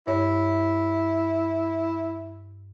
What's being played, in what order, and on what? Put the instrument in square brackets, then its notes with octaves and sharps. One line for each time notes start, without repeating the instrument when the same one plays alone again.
[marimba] G2 C#5 [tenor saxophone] E4